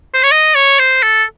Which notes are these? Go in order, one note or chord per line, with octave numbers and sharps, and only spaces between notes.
C5
C#5
D#5
C#5
C5
A4